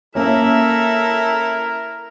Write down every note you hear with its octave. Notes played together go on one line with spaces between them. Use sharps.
A#3 C#4 E4 A4 A#4 E5 A#5